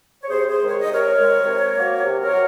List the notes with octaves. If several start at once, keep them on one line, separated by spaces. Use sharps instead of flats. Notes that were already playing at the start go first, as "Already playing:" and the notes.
C#5
C3 G#4 C5
G#4 C5
D#3 G#3
C#5
D#5
C3
A#4 C#5
D#3 G#3
C3
F#3 A#3
C3
A#4 C#5
F#3